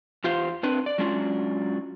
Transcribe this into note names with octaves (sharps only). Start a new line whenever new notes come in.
E2 F4 G4 C5 F5
C4 D4 B4
D5
F#3 G#3 C#4 D4 F4